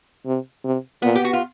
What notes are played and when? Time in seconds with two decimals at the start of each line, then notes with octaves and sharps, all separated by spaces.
0.26 C3
0.64 C3
1.02 A#2 B3
1.15 G4
1.25 F#4
1.33 F4